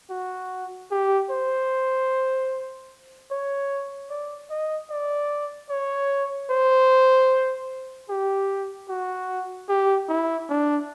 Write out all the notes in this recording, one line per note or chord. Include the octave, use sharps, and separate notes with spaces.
F#4
G4
C5
C#5
D5
D#5
D5
C#5
C5
G4
F#4
G4
E4
D4